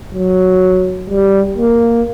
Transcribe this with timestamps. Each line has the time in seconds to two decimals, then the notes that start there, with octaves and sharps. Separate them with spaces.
0.15 F#3
1.10 G3
1.58 A#3